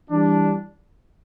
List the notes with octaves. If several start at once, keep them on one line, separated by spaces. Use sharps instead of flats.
E3 G3 D4